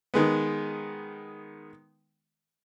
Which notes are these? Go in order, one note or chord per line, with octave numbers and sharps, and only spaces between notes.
D#3 G#3 B3